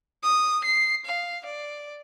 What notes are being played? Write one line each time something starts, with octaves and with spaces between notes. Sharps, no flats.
D#6
C7
F5
D5